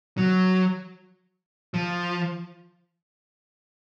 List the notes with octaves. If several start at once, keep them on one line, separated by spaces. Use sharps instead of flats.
F#3
F3